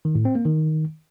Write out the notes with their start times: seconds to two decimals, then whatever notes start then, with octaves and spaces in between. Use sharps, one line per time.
0.05 D#3
0.15 A2
0.25 C4
0.35 A#3
0.45 D#3